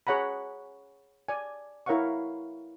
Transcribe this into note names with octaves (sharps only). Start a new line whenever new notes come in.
G#4 C#5 F#5 A#5 B5
D5 G#5
E4 A#4 C#5 F5 F#5 C#6